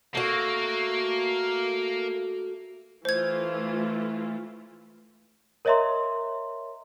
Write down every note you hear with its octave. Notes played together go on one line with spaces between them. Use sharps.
A3 A#3 F#4
E3 A3 F4 C5 G#6
A#4 C#5 D#5 E5 A#5 C6